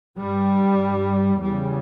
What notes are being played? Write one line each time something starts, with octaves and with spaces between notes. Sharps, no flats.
G2 G3
E2 C#3 G3